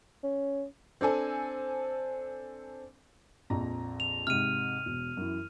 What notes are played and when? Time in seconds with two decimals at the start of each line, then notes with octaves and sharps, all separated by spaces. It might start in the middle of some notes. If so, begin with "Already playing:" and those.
0.24 C#4
1.01 C4 D4 A4 G#5
3.50 A#1 F2 A#5
4.00 F7
4.27 G#2 C3 F6 D#7
4.86 E1
5.17 F#2 E3